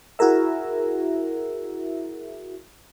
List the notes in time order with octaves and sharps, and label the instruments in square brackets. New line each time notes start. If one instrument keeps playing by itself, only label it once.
[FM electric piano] E4 F#4 G#4 A#4 E5